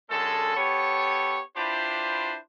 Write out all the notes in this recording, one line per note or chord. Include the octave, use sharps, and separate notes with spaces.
F#2 D3 G#3 A4
B3 G4 A4 C#5
D4 E4 F4 G4 B4 C5